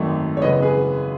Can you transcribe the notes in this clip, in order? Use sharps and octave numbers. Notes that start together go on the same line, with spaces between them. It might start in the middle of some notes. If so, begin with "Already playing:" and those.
Already playing: G#1 F#2 D#3 A3
C#5
G#1 F#2 C#3 E3 B3 B4 D#5
G#4 B4